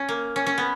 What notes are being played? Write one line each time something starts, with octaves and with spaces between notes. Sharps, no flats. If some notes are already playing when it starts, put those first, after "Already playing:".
Already playing: C#4
A#3
C#4
C#4
B3